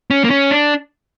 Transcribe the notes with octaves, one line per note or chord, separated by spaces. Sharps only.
C#4
A#3
C#4
D4